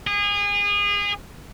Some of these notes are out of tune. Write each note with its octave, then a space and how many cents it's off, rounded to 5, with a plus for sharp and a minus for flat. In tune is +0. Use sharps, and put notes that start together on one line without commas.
G#4 -30